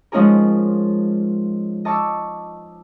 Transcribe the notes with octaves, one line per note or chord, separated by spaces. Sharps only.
F3 G#3 C#4 D#4 G#4 A#4
D#5 A5 C#6 D6 E6